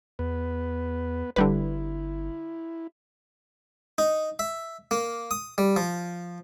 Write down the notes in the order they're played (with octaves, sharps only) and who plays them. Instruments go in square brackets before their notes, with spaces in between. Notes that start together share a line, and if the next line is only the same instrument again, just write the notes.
[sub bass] E2 [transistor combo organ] B3 B4
[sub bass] G1 [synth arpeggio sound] D3 G3 B4 [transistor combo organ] E4
[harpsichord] D#4
E5
A#3
D#6
G3
F3